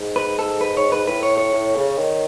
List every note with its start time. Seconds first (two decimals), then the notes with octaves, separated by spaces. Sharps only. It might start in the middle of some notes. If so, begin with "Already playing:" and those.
Already playing: G#2
0.16 B4
0.39 A4
0.61 B4
0.77 C#5
0.92 B4
1.06 A2 B4
1.23 C#5
1.38 C#5
1.53 A2
1.76 C#3
1.98 D#3